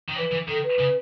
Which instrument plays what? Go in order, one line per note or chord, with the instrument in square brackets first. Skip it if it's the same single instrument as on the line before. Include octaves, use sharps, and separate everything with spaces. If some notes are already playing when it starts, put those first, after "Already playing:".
[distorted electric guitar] D#3
[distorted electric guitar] E3 [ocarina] C#5
[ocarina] B4
[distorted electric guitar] E3
[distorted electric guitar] D#3 [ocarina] A4
[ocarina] B4
[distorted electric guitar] C#3